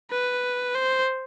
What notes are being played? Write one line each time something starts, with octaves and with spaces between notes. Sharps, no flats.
B4
C5